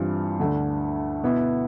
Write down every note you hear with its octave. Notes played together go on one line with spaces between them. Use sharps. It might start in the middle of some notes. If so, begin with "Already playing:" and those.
Already playing: G2 E3 G3 C4 F4
D2 D3 A3 D4
B2 B3 E4